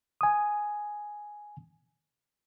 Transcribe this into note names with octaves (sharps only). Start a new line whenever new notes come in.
G#5 D#6